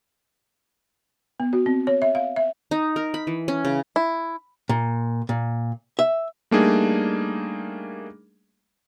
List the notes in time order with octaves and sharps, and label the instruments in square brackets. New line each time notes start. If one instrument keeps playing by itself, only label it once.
[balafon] B3
F#4
C4
C#5
E5
F5
E5
[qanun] D#4
A#4
B5
E3
C#4
C#3
[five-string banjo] E4
[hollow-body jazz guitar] A#2
A#2
E5
[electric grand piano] G3 A3 A#3 D4 D#4 G#4